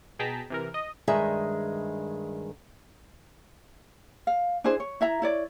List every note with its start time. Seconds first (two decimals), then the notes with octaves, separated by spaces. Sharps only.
0.19 B2 G#4 G5 A5 A#5 B6
0.50 C3 E3 A#4
0.74 D#5
1.08 G2 D#3 G#3 G#4 E5
4.27 F5
4.64 D4 E4 G#4 C5
4.80 C#5
5.01 E4 E5 A#5
5.22 E4 C#5 D5